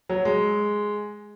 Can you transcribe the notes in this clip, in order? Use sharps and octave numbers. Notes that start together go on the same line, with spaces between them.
F#3
G#3